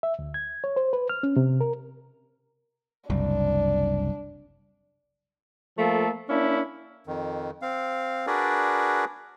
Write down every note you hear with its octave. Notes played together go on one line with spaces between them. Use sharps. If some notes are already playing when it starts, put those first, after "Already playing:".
E5
D2
G#6
C#5
C5
B4
F6
C#4
C3
A#4
F#1 C2 D4
F3 A3 A#3 A4
A#3 C#4 D4 E4
F2 D#3
C4 F5
D4 F#4 G#4 A#4 B4 D5